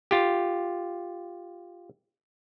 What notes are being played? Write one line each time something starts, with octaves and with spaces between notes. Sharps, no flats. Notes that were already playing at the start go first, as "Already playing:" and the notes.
F4 G4